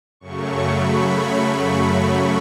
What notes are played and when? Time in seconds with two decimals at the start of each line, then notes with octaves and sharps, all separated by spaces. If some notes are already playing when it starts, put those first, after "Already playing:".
0.20 F#2 C#3 F#3 A3 C#6
0.71 B5